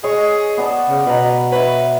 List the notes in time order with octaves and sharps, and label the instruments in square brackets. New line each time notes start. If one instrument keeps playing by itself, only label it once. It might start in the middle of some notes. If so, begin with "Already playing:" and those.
[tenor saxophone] G#4 [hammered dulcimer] C#5 D#5 G#5
[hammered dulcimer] B3 D5 A5
[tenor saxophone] C#3
[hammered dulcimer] B2 A#5 [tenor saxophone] B4
[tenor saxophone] B4 [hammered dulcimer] C#5 E5